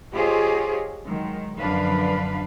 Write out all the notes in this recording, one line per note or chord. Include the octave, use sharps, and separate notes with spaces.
F4 G4 G#4 C5 C#5 D#5
D#3 F#3 G#3
F#2 D3 F3 D4 B4 F5